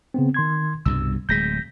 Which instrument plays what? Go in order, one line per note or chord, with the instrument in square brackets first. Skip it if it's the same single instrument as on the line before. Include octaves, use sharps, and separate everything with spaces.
[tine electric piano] C#3 B3 C4
D#3 C6 G#6
[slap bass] C2 G2 B2 [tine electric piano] E6
[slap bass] D1 G#3 [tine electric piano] G6 A#6 B6